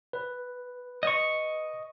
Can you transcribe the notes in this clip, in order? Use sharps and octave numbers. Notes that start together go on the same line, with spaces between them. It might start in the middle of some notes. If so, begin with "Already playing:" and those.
B4
D#5 C#6